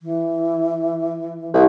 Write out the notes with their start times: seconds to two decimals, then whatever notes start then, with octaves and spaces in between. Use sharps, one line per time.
0.02 E3
1.54 C2